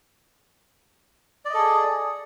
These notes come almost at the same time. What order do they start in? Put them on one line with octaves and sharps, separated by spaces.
D5 D#5 A4 G#4